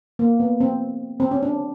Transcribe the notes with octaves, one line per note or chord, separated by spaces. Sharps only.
A#3
B3
C4
C4
C#4
D4